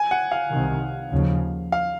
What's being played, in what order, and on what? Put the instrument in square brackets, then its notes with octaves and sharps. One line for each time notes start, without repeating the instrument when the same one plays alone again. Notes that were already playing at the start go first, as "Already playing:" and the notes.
Already playing: [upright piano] G#5
F#5
F5
[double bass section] C2 C3 D#3
D#2 C#3 F3
[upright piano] F5